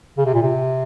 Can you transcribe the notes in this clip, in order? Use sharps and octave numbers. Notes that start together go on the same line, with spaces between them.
C#3
C3
A#2
C3